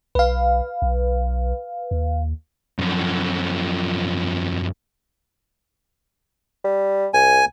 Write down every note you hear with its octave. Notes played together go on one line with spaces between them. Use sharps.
B1 B4 F5
B1
D#2
F#2 F3
G3
C2 G#5